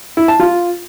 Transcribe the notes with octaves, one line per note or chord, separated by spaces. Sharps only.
E4
A5
F4